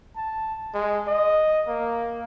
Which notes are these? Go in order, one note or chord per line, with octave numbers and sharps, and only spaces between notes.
A5
G#3
D#5
A#3